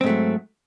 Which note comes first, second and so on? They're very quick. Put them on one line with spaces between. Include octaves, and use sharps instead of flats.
C4 G#2 A3 F#3